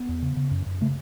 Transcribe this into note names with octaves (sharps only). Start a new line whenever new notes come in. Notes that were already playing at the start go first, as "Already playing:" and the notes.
Already playing: B3
E2
C#3
C#3
F#2
F#2
C#3 A3